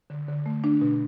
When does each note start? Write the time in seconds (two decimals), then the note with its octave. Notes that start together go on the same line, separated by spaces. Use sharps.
0.10 D3
0.28 D3
0.46 A3
0.64 D4
0.81 B2